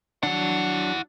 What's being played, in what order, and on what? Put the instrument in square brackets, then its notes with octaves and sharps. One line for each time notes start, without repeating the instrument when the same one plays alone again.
[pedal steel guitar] F#3 D4 [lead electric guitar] E4 F#5